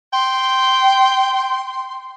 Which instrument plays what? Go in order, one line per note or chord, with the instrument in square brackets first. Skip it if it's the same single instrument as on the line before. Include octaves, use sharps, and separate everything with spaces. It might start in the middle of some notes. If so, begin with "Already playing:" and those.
[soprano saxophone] G5 [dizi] C6